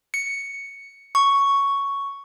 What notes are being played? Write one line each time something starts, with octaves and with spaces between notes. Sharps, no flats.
C#7
C#6